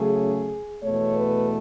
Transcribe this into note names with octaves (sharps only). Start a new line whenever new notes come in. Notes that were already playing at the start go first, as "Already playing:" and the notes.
Already playing: C#3 F#3 A3 C#4 G#4
E2 B2 A3 C#5
B4